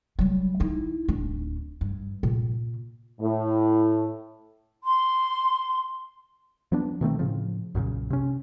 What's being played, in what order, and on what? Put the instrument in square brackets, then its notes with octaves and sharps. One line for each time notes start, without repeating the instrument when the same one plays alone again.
[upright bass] F#3 G3
D#4 E4
D1 D4
G2
A#2
[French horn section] A2
[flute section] C6
[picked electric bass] F3 B3 D4
B2 D#3 A3 C4
A2 C#3 F3
B1 F#2 A#2 C#3
C3 C#4